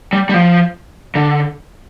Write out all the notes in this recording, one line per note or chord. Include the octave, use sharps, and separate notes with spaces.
G3
G3
F3
D3